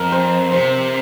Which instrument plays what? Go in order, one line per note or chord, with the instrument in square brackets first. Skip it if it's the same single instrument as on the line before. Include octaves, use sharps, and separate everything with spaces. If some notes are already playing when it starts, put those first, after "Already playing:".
Already playing: [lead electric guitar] F2 [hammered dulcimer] A#4
[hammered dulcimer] C5
[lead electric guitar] C3 [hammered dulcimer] C5